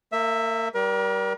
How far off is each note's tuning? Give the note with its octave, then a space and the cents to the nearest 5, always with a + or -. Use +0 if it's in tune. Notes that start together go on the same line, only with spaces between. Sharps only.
A#3 -35 E5 +0
G3 -20 A#4 +35